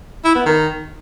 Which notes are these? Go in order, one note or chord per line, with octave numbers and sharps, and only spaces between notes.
E4
B3
D#3